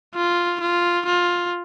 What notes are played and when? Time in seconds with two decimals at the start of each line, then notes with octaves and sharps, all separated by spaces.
0.15 F4
0.61 F4
1.06 F4